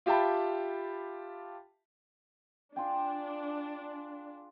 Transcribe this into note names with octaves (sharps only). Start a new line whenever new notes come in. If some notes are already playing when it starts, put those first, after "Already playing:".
F4 G4 E5 G5 A5 B5
D4 F4 G#4 G5